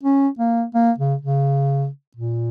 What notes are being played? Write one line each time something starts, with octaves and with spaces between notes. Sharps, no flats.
C#4
A#3
A#3
C#3
C#3
A#2